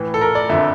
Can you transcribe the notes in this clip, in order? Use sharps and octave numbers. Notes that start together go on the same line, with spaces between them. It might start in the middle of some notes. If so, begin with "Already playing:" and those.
Already playing: A2 E3
A4
A#4
D5
F2 D3 F3 E5